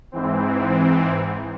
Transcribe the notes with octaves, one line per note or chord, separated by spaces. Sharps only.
G#2 E3 C4